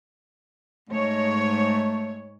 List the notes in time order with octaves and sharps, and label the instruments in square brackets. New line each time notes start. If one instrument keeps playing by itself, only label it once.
[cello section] G#2 C#5 [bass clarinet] A3